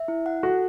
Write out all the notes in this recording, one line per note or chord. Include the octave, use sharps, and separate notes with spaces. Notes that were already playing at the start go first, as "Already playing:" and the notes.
Already playing: E5
E4
F#5
F#4 A4